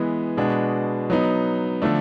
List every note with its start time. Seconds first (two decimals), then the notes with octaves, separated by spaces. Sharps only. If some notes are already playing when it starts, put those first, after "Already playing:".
Already playing: E3 G#3 B3
0.37 B2 G#3 B3 D4 F#4
1.10 F#3 B3 D#4
1.82 D3 F3 A3 D4